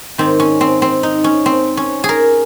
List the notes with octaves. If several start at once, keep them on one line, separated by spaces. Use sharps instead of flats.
G#2 D#3 C4
C#4
C4
C4
D#4
C#4
C4
C#4
G#4
A#4